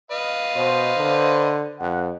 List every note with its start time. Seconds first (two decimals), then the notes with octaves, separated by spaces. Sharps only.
0.11 B4 D#5 F5
0.56 B2 C5
0.97 D3
1.80 F2 F#5